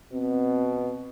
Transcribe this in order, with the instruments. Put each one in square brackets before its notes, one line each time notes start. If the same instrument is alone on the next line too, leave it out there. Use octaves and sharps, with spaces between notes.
[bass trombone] B2 [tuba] C4